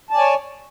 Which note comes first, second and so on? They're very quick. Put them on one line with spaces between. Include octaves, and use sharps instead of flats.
A5 D5 G#5 C#5